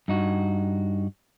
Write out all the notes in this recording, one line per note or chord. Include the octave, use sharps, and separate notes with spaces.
G2 D#4 F#4